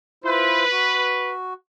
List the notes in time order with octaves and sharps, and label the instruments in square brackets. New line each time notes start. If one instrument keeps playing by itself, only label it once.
[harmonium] E4 F4 C5 [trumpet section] B4
[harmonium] F#4